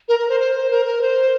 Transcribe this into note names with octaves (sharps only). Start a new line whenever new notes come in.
A#4
A#4
C5
C5
A#4
A#4
C5